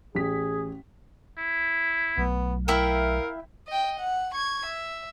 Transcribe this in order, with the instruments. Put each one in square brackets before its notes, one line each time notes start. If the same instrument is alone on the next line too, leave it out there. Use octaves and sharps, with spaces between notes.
[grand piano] A1 B6 [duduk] G#4
[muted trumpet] E4
[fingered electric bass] B1 F#3 A3 [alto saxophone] B3
[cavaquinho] E4 E5 G5 [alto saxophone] A#4 [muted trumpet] F5
[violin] D#5 G5
F#5
C#6 G#6
E5